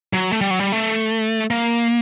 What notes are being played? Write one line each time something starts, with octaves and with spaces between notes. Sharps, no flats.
F#3
A3
G3
F#3
G3
A3
A#3